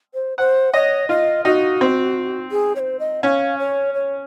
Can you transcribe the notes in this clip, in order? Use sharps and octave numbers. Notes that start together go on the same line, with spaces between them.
C5
C5 F#5
C#5 D#5
F4 D#5
D#4 F#4
C4
G#4
C#5
C5
D#5
C#4 F5 F#5
C#5
C#5